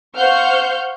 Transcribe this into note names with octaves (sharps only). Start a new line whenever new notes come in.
C5 F5 F#5 C#6 F6 G6